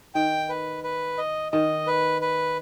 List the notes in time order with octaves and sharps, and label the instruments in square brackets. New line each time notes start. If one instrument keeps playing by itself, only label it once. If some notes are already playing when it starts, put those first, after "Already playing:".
[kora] D#3 [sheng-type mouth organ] G5
[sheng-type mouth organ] B4
B4
D#5
[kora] D#3 [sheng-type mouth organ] D#5
[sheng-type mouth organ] B4
B4